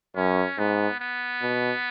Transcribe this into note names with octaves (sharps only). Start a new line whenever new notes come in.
F#2 C#4
G#2 B3
B3
B2